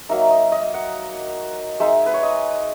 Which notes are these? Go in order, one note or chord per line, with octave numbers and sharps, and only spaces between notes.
F#3 A#3 D#4 E5
D#5
D#5
F#5
G#3 D#4 E5
B4
C#5
D#5